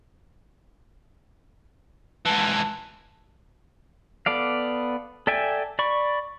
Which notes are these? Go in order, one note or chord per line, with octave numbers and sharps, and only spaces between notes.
G#2 E3 A5
B3 A4 D5 F5
A4 D5 E5 G5 G#5
D5 B5 C#6